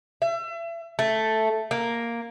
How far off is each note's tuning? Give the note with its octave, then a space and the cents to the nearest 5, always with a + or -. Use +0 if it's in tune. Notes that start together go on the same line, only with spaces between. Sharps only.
E5 +35
A3 +0
A#3 +0